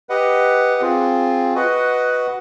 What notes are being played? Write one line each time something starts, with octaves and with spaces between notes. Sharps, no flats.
G4 B4 D#5 F#5
C4 F4 G#4
F#4 B4 D#5 F#5